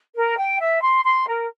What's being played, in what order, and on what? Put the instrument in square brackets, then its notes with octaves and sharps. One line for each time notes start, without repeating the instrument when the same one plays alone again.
[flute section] A#4
G5
E5
C6
C6
A#4